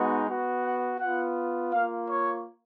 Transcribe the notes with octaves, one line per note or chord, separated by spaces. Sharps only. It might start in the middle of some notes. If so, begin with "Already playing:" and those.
Already playing: G#3 B3 D#4 F#4
B3 F#4
F#5
B3 F4 F#5
A#3 F4 F5
C#5